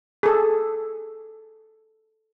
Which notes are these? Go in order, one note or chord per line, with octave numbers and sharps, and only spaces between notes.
G#4 A4